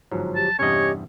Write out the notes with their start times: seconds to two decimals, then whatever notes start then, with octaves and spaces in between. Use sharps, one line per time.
0.12 G1 G#2 F3 F#3
0.36 G4 A5
0.59 E2 G2 C3 C#4 G4 C#5 D#5